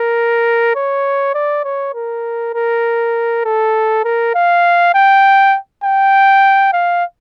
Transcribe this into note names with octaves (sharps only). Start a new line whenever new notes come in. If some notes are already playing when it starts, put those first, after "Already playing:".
Already playing: A#4
C#5
D5
C#5
A#4
A#4
A4
A#4
F5
G5
G5
F5